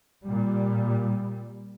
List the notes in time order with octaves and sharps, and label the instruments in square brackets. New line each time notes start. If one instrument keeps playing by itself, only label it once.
[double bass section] A#2 G3